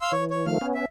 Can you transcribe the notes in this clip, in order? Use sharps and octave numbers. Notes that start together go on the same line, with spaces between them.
F5 C6 E6
E3 C#5
C#5
D#3 F3 A3 F5 F6
B3 C#4
E5